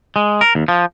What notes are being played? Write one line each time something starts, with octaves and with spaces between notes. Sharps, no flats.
G#3
A#4
D#2
F3